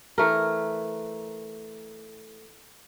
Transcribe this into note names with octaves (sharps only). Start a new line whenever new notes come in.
E3 A3 A#4